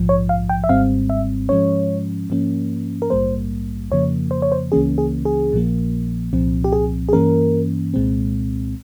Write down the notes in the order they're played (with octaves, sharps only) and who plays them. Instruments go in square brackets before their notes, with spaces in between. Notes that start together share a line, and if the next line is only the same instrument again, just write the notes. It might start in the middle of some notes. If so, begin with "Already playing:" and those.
Already playing: [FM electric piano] A#1 G#2 F3
C#5
F5
G5
E5
G#1 G#2 G3 C4 F5
E5
G#2 F3 G#3 C#4 C#5
G#2 F3 A#3 C#4
A#4
A#1 G#2 G3 A#3 C5
F2 C#3 F3 A#3 C#5
C5
C#5
C5
C#2 C#3 E3 A#3 C#4 G#4
G#4
G#4
A#1 A#2 F3 A#3
C2 A#2 F3 C4
G4
G#4
G#4
G2 E3 A#3 C#4 A#4
C2 A#2 G#3 C4